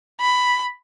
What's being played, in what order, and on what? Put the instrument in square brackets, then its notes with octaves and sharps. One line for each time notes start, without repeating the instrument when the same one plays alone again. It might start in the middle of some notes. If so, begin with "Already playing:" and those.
[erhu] B5